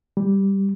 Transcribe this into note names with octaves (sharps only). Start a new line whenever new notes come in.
G3